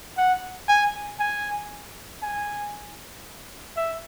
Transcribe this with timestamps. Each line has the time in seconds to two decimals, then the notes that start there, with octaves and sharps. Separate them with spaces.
0.18 F#5
0.68 G#5
1.20 G#5
2.22 G#5
3.77 E5